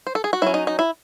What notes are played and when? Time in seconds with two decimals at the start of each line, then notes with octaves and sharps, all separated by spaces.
0.07 C5
0.15 A4
0.24 G#4
0.33 F#4
0.42 F#3 C#4 E4
0.54 D#4
0.67 D#4
0.79 E4